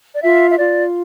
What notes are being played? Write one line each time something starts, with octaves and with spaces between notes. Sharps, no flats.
D5
F4 E5
E5
F4 D5